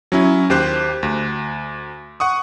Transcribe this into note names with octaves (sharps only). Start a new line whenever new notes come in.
F#3 C#4 E4
D#2 G4 C5 F#6
D2
F#5 C#6 D#6